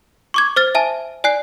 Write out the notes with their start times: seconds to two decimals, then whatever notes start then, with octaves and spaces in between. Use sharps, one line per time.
0.34 C#6 D6 G#6
0.56 C5 F6 A6
0.75 E5 G#5 A5
1.24 D5 G#5 F#6 C7